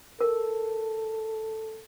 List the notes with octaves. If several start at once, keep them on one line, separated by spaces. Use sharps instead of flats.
A4 A#4